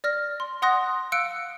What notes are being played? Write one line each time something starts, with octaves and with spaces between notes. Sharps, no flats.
D5 F6 A#6
C6
F#5 C6 D#6 F#6 A#6
F5 E6 F#6 C#7 D7